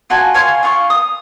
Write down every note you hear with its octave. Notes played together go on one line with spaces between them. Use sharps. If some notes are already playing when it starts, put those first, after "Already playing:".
F4 F#4 G#5 A5
C#5 F5 G#5 C6
F4 F5 C#6 D6
D#6